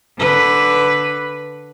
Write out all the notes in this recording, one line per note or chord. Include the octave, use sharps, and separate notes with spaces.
D3 B4